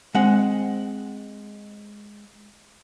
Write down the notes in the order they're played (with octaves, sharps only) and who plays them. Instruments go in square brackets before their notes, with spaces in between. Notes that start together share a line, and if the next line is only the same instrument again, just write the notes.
[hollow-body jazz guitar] G#3 C4 F#5